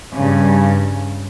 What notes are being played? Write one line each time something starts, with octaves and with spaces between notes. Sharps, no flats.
G2 C#3